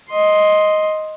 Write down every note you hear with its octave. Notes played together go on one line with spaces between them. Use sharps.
D#5 C6